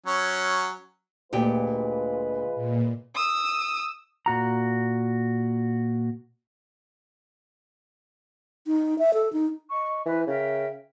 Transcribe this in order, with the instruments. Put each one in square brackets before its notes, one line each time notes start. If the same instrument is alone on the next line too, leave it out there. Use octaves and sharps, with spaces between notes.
[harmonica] F#3 C#4
[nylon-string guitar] D2 A#2 G4 [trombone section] G#3 F4 B4
[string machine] A#2
[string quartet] D#6 E6
[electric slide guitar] A#2 F#4 A#5
[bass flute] D#4
E5
A4
D#4
[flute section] D#5 C#6
[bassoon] E3 [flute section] B4 C5
[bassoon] C#3 [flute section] A#4 E5 G5